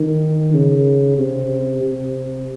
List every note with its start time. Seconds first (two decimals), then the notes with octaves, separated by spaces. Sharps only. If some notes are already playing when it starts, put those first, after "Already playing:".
Already playing: D#3
0.54 C#3
1.18 C3
1.83 C3